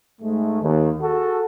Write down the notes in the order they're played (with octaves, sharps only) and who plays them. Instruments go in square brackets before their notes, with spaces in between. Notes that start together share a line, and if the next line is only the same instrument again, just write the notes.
[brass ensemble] G#2 G#3 A3
D#2
F#4 G#4 A4